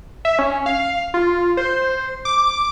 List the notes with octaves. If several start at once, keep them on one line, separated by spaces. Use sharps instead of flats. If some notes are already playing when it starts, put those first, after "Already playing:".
E5
C#4
F5
F4
C5
D6